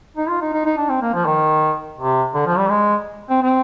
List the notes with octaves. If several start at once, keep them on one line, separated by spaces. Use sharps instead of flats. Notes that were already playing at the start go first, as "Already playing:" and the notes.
D#4
F4
D#4
D#4
D#4
D4
C4
A#3
F3
D#3
C3
D3
F3
G3
G#3
C4
C4